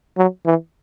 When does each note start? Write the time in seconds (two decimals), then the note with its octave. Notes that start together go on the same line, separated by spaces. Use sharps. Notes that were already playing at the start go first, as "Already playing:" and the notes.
0.17 F#3
0.46 E3